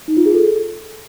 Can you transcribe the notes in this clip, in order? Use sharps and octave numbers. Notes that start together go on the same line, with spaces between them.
D#4
F4
G#4
A4